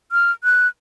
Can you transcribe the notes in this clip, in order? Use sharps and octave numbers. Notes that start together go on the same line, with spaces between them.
F6
F#6